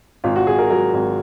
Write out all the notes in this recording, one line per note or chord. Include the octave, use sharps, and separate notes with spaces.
G#1 F4
F#4
G#1 G#4
A#4
F#3 A#4
G#1